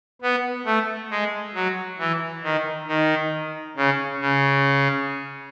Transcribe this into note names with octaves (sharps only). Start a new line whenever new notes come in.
B3
A3
G#3
F#3
E3
D#3
D#3
C#3
C#3